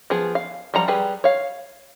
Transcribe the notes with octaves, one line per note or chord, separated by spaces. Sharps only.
F3 B3 G#4
F5
F3 G3 F4 F#5 A#5
G3 G4 G#4 B4
C#5 F5